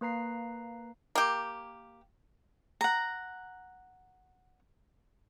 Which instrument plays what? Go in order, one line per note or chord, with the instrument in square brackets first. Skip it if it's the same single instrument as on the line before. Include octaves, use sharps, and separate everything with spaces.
[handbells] A#3 B4 A#5 C7
[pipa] A#3 G4
[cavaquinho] F#5 A#5